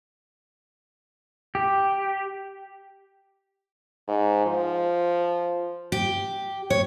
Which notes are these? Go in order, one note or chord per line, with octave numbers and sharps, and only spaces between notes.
G4
G#2
F3
G4
C#5